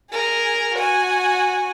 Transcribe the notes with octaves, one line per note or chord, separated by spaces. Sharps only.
G#4 A#4
F#4 G#5